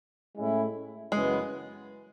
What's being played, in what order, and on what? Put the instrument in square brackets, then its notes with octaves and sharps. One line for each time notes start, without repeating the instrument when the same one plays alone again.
[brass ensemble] A2 G#3 C#4 E4
[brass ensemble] F#2 C#3 E3 B3 [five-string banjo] G#3